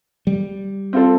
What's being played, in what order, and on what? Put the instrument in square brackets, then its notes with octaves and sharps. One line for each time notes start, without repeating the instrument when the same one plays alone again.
[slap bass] G3
[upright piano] C4 F4 A4 C5